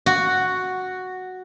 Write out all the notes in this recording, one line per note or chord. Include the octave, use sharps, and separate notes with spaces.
F#4